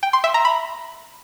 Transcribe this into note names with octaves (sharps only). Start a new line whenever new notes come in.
G5
C6
E5
A#5
B5